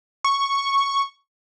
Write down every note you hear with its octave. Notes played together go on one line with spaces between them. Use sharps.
C#6